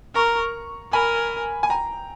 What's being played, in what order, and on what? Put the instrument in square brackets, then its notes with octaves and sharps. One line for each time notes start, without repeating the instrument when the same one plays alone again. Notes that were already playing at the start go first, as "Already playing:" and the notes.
[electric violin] A#4 [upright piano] A#5 C#6
[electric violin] A#4 [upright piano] G#5 B5
[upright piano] G#5
G5 A#5